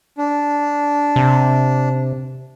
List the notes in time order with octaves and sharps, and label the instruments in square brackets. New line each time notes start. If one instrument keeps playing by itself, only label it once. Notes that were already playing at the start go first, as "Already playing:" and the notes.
[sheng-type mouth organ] D4
[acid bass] C3